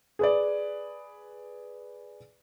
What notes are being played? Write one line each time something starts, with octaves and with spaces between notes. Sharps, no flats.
G#4 B4 D5